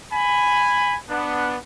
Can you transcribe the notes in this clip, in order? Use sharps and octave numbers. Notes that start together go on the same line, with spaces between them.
G#5 B5
B3 D4